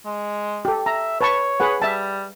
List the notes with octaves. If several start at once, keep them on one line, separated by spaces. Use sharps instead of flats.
G#3
G4 A4
E5 A#5
B4 C#5 A5 C#6
G#4 B4 F#5
G3 E5 A5